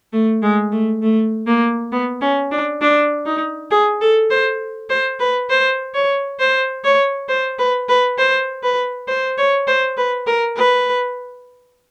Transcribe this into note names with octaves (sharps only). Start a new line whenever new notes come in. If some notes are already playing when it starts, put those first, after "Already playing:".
A3
G#3
A3
A3
A#3
B3
C#4
D4
D4
D#4
G#4
A4
C5
C5
B4
C5
C#5
C5
C#5
C5
B4
B4
C5
B4
C5
C#5
C5
B4
A#4
B4